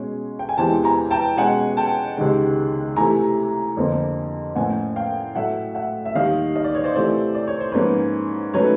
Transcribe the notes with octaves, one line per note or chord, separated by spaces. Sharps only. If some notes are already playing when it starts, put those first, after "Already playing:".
Already playing: B2 G#3 C#4
G5
G#5
E2 C3 E3 G#3 C4 G5 A5
G#5 A#5
G5 A5
B2 G#3 C#4 F#5 G#5
G5 A5
C#2 C3 D#3 G#3
C3 E3 A3 G#5 A#5
F2 D3 F3 A#3
A2 F3 A#3 C#4 F#5 G#5
F5 G5
A2 F#3 A3 E5 F#5
E5 F#5
E5
D#2 D#3 G3 D#5 F5
D#5
D5
C#5
C5 D5
C3 E3 A3 C4 C5 D5
D5
C#5
C5
G#2 F3 A#3 C#4 B4 C#5
D#3 F#3 A3 C#4 B4 C#5